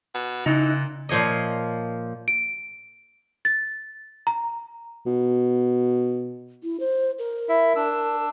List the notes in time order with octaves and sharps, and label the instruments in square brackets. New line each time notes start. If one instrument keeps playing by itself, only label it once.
[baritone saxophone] B2
[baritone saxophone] A#2 [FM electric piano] C#3 F#6 [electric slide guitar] D#4 E4
[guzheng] A#2 F3 C#5 D#5
[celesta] D7
A6
A#5
[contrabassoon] B2
[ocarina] E4
C5
A#4
[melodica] E4 E5
D4 E6